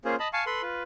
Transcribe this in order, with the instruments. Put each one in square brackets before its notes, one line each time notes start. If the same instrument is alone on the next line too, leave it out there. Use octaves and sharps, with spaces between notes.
[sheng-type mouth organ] A#3 C#4 F4 G#4 C5
D#5 A5 B5
F5 G#5 A5 C#6
A4 B4 B5 C6
F4 B4